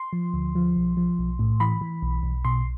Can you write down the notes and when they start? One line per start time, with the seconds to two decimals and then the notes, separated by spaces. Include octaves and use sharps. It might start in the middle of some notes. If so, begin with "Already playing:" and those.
Already playing: C6
0.13 F3
0.34 D2
0.55 F3
0.76 B1
0.97 F3
1.19 B1
1.39 A2
1.60 E3 B5
1.81 E3
2.02 B1
2.23 B1
2.45 B2 C6